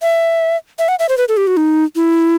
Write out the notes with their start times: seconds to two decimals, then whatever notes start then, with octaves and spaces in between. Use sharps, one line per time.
0.02 E5
0.79 E5
0.88 F#5
0.99 E5
1.09 C5
1.18 B4
1.28 A4
1.37 G4
1.47 F#4
1.57 D#4
1.96 E4